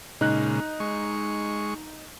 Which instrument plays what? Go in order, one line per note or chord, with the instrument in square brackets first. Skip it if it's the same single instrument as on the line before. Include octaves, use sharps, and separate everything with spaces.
[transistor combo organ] A#2 C#3 G#3 [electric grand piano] D#4 F#6
[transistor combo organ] G#3 C#6